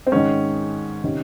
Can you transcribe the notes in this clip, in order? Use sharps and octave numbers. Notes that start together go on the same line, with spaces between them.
C4
G#2 D#3 C#4
C3 D#3 C#4